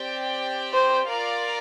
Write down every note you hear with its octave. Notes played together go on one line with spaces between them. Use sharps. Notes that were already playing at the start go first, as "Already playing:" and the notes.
Already playing: C4 G4 D5 G5
C5
F4 A#4 D5 F5